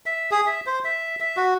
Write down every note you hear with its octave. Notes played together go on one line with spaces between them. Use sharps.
E5
G#4
E5
C5
E5
E5
F#4